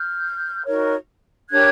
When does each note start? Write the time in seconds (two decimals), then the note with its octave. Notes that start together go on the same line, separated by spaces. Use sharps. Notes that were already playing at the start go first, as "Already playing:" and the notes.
Already playing: F6 G6
0.64 D#4 F#4 A#4 C#5
1.50 D4 G4 A#4 C#5 F#6 G#6